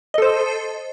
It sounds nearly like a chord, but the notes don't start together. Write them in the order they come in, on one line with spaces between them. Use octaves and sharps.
D#5 A4 C5